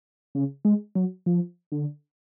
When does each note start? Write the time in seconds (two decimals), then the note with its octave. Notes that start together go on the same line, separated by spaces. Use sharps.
0.35 C#3
0.65 G#3
0.95 F#3
1.26 F3
1.72 D3